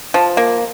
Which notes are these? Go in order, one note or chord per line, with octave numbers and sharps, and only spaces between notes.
F3
A#3